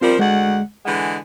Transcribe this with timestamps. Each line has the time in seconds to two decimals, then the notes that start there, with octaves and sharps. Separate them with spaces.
0.01 F3 G3 C4 F4 A#4 C5
0.19 D2 G#3 F#5
0.85 D3 E3 G#3 F#5